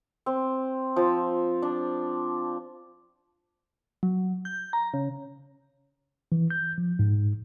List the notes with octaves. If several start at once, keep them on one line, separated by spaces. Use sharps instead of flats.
C4
F3
D4
F#3
G6
A#5
C#3
E3
G6
F3
G#2